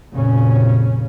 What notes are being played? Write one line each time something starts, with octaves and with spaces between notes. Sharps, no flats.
F1 A#2 C#3 C#4